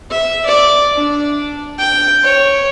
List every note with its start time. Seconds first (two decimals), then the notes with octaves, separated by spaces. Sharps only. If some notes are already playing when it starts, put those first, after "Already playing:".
0.11 E5
0.46 D5
0.96 D4
1.79 G5
2.24 C#5